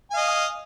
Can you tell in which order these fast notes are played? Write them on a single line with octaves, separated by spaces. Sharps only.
G#5 F5 D#5